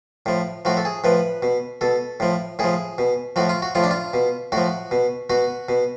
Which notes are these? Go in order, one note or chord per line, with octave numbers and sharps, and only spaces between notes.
A2 F3
A2 F3 F#4
A4
G#4
A2 F3 B4
B2
B2 A4
A2 F3
A2 F3 G#4
B2
A2 F3 F#4
F4
F#4
A2 F3 F4
D4
F4
B2
A2 F3 F#4
B2
B2 F#4
B2